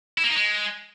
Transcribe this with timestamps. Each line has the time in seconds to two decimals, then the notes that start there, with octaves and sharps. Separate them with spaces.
0.18 E4
0.24 A#3
0.30 D#4
0.36 G#3